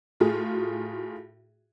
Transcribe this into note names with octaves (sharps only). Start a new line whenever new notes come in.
A2 F4 F#4 G#4